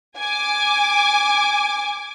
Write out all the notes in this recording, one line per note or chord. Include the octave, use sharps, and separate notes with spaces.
G#5 D6